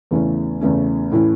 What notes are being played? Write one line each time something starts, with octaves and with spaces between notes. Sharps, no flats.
E2 C#3 E3 A3 C#4
E2 C#3 E3 A3 C#4
A2 E3 A3 C#4 E4